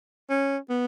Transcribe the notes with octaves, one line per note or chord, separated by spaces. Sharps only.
C#4
B3